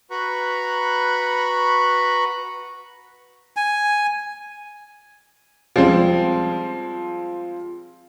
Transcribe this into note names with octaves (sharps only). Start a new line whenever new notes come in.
F#4 B4 A#5 B5 C#6 F#6
G#5
F3 G3 G#3 C4